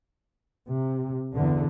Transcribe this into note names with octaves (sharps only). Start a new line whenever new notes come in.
C3
E2 D3